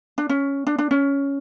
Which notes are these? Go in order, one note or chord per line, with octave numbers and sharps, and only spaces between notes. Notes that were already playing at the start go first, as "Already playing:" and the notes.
D4
C#4
D4
D4
C#4